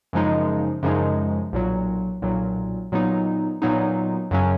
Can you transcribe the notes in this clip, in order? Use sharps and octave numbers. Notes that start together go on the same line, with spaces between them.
F#2 C#3 F3 G#3 D#4
F#2 C#3 F3 G#3 D#4
B1 A#2 F#3
B1 A#2 F#3
A#2 F#3 B3 D#4
A#2 F#3 B3 D#4
F#2 C#3 F#3 C#4